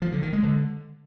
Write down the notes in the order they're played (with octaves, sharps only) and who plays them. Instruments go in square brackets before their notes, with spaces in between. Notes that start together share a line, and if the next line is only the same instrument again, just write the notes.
[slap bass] F3
D3
D#3
G#3
D3